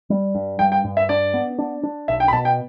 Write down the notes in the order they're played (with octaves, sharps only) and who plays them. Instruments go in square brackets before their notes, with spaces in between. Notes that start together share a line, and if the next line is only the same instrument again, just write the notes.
[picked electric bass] G3
G2
[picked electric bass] G2 [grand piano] G5
[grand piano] G5
[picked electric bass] G2
[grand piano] E5
[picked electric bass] D4 [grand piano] D5
[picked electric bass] B3
D4
D4
[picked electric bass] B1 [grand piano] E5
[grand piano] G5
B5
[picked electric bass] B2 [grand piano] A5
[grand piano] G5